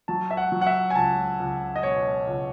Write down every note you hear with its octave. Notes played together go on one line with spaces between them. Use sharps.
F#3 A5
E5
F#5
F#3
F#5
E5
G#5
C#2 A5
C#2
D#5
B2 C#5
C#2